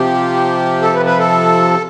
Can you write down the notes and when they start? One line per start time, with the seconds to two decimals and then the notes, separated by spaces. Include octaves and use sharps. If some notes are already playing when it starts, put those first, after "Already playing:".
Already playing: C3 F3 G4
0.82 A4
0.94 B4
1.06 B4
1.19 A4